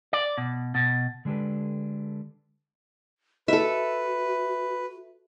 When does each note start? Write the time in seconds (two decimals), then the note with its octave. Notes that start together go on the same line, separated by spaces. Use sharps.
0.13 D5
0.38 B2
0.75 B2
1.25 D3 G#3 D4 G4 A4 B4
3.48 F#4 A4 B4 E5